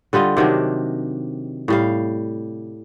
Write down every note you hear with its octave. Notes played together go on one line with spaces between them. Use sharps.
D3 G3 F4 D#5
C3 D#3 F#3 D4
A2 G3 F5